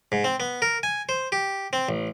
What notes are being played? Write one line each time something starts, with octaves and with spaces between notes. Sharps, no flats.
G#2
C4
B3
A#4
G#5
C5
G4
C4
A1